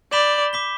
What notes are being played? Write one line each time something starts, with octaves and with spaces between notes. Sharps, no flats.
D5 B5 G6 B6 E7 G7
D6 B6 G7